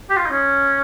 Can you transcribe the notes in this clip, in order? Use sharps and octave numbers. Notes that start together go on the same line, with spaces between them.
G4
F4
D#4
C#4